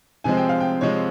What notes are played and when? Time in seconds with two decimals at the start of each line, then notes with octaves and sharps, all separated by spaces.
0.24 C3 F3 G#3 C4 G#5
0.37 G5
0.49 F5
0.60 G5
0.81 C3 F3 G#3 C4 C#5